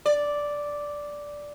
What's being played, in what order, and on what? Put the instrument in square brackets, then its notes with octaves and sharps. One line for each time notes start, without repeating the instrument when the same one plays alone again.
[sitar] D5